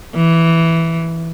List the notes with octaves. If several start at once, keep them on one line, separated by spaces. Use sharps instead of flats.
E3